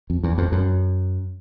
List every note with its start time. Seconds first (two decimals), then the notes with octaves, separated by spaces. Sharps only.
0.10 F2
0.23 E2
0.38 F2
0.52 F#2